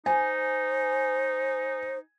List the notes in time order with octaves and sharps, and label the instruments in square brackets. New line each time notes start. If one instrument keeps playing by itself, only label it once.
[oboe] D#4 [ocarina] C5 [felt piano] G#5